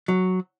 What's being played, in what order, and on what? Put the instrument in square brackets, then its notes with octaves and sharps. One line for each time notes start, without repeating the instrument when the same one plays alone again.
[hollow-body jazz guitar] F#3